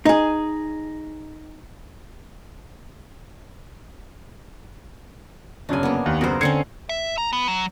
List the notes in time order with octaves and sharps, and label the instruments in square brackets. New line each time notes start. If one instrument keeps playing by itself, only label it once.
[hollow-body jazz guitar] D#4 G#4
[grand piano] G1 F#2 C#3 [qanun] D4 G#5
[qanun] A#3 B3
[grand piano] D#2
[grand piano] F#2 C#3 B3 [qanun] A#4 C5
[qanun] D3 C4 C#4 [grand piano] G#6 C7 C#7
[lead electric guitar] E5
A#5
B3
F#3